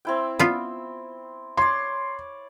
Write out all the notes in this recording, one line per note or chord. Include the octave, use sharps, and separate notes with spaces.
C4 E4 G5
B3 F4
C#5 D5 C6